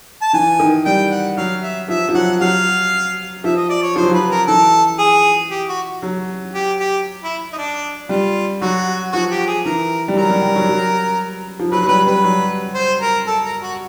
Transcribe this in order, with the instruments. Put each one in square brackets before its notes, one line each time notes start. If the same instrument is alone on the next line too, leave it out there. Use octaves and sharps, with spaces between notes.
[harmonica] A5
[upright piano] E3 [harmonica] G#5
[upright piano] D#3
[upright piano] G3 [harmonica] G5
[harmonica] F#5
[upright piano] F#3 [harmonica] F5
[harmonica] E5
[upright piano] F3 [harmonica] E5
[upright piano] F3
[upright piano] F#3 [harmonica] F#5
[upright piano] F#3 [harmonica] F5
[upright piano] F3 [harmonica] E5
[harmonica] D#5
D5
C#5
[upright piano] F3 [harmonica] C5
[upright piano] F#3
[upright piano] F3 [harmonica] B4
[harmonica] A#4
[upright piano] E3 [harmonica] A4
[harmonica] G#4
G4
F#4
[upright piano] F#3
[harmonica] G4
G4
E4
D#4
D4
[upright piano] G3 [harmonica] F4
[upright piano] F#3 [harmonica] F#4
[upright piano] F3 [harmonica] F#4
[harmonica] G4
G#4
[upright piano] E3 [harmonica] A#4
[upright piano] G3
[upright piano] F#3 [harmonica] A#4
[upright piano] G3
G3
F#3
F#3
F3
[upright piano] F#3 [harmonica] B4
[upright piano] F#3
[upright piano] G3 [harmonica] B4
[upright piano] G3 [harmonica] B4
[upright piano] F#3
[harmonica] C5
A#4
A4
A#4
F#4